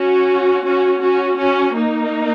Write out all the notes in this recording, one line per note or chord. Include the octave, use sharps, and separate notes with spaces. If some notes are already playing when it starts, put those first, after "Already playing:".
Already playing: C#4 F#4
C#4 F#4
C#4 F#4
C#4 F#4
A#3 D#4